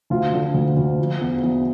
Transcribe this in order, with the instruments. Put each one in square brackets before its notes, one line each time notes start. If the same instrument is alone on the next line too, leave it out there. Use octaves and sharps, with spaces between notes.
[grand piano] D2 F4
D3
D2
D2
F3
E2
E2